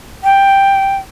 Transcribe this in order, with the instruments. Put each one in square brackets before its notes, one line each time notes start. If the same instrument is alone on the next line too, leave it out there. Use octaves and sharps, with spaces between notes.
[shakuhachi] G5